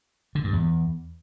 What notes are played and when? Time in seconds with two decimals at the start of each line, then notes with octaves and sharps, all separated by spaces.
0.35 D3
0.44 G2
0.53 E2